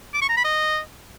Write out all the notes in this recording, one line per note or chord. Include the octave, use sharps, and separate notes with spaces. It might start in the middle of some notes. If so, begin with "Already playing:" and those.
D6
C#6
A#5
B5
D#5